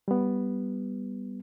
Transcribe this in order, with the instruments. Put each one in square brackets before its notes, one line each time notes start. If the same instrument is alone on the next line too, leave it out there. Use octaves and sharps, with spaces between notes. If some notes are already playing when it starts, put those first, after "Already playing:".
[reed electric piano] G3 B3